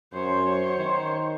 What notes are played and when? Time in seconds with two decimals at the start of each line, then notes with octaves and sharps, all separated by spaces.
0.13 F#2 C5 C#5
0.78 D#3